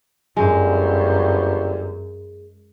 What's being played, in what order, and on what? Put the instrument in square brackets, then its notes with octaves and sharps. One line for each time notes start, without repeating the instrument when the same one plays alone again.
[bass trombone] G1 [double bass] F#2 [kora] G#3